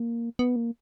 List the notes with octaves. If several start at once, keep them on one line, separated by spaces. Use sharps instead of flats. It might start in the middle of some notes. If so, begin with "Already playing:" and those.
Already playing: A#3
B3
A#3